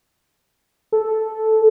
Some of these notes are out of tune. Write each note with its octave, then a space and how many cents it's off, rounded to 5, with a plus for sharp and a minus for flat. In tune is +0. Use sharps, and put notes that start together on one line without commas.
A4 -5